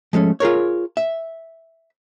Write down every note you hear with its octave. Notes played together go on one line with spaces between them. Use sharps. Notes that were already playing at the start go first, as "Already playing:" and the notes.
F3 G#3 A3 C#4
F4 G#4 A#4 C#5
E5